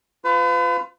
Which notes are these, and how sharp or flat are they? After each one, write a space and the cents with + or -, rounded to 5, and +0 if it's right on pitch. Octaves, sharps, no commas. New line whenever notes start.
F4 +0 B4 +40